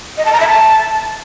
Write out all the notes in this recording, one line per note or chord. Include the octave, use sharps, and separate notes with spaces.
D#5
A5
A#5
E5
A5